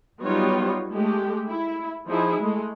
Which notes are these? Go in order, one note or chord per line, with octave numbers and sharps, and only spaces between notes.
F#3 G3 B3 D#4 F4 C#5
G#3 A3 G4
E4
F3 D#4 E4 G#4
G#3 A3